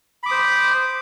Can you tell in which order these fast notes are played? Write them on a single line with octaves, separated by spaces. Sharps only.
B5 D6 D#6 C5